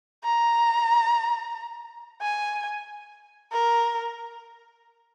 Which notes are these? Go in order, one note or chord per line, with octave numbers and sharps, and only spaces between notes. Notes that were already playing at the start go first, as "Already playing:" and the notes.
A#5
G#5
A#4